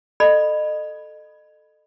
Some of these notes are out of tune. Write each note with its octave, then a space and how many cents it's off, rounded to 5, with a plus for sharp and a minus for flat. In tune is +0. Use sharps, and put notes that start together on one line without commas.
A4 +0 D#5 -30 B5 +0